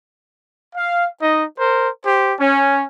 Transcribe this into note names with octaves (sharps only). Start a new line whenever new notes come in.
F5
D#4 D#5
A#4 C5
G4 C5
C#4